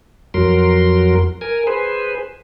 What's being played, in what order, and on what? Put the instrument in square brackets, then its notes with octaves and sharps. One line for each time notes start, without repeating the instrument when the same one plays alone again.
[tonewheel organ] F2 F#3 A#4 C6
A#4 G#5
G#4 B4 C5